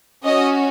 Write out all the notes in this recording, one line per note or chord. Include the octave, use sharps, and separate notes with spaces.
C#4 F#4 D#5